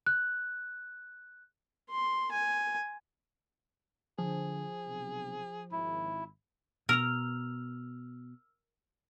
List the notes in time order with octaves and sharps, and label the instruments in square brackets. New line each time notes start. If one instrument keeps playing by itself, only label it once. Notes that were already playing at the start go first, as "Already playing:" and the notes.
[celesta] F#6
[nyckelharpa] C6
G#5
[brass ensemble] D3 [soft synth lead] F3 [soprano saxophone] G#4
[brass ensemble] B1 C3
[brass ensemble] G#1 [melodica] E4
[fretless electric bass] B2 [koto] A#4 [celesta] E6 F6 F7